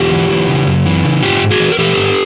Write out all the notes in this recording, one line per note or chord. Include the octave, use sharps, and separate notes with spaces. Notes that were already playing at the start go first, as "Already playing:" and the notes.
Already playing: E2 F4 G4
E3
E3
C#3
F#2
E3
C#3
G#2 F4 G4
G#2
F#4 G#4
E3
A#4
E3 G4 A4
G#2